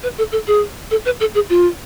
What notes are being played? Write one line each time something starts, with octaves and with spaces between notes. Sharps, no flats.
B4
A4
A4
G#4
A4
B4
A4
G#4
F4